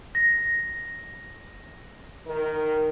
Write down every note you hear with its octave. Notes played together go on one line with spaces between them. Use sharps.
A#6
D#3 A#4